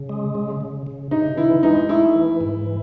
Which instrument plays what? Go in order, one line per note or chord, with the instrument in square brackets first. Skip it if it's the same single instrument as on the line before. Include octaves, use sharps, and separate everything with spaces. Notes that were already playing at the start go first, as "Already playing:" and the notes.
Already playing: [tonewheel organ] C#3
G#3
C#3
C#3
C#3
[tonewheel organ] C#3 [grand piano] D#4
[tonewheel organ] E3 [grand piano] E4
[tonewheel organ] G#3 [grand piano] D#4
[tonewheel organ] A3 [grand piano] E4
[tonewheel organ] E3
G#2
E3